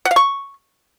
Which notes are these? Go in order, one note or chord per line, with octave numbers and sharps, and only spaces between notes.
F#5
F5
C#6